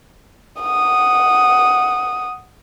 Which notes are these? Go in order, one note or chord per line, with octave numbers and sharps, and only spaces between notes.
F#5 D#6